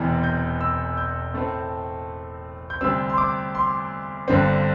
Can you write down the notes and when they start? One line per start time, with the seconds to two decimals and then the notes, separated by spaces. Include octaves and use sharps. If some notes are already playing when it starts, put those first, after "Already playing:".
Already playing: E1 E2 C3 E3
0.24 G6
0.61 E6
0.97 G6
1.34 A2 A3 C4
2.70 G6
2.81 D2 C3 G3 C4 E6
3.09 C6
3.18 D6
3.55 C6
4.28 G1 G2 D3 C4